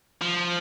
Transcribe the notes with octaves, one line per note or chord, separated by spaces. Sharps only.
F3